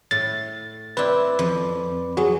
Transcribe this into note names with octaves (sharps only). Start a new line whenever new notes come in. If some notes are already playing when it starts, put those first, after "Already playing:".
A2 A6
C4 E4 B4 D5
F2
F#3 F#4 G#4